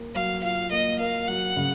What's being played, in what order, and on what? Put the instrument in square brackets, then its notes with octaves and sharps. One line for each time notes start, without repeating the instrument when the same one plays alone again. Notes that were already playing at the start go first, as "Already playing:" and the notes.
Already playing: [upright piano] A#3 A#4
[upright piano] F#3 [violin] F5
[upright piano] F4 [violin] F5
[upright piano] A#3 [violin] D#5
[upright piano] A#4 [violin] F5
[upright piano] F#3 [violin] F#5
[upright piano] C#3